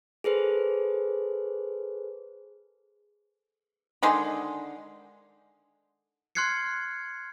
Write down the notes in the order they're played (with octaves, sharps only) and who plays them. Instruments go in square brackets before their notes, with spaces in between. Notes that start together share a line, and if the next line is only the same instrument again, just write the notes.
[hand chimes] G#4 A4 B4 C5
[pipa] D3 D#3 G#3 C6
[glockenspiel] C6 F6 F#6 G#6 C7 C#7